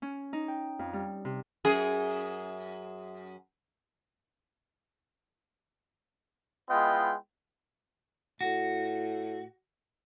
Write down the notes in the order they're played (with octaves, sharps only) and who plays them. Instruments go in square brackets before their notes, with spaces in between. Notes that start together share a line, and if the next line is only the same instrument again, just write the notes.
[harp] C#4
D#4
G5
F2
G3
C3
[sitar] F#2 G#4
[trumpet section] G#3 B3 E4 F4 D#5 G5
[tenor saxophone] A2 [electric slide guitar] F#4